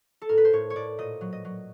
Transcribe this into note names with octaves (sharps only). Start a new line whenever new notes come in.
A4
A2 A#4
B4
C5
A2 C#5
C#5
A2 D5
A#2 D#5
F#3
D#5
F#3